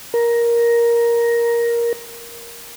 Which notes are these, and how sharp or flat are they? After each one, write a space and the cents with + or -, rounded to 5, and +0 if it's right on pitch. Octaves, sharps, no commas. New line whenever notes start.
A#4 +10